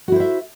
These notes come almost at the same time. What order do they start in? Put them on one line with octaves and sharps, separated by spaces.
F#4 E4 C5 E5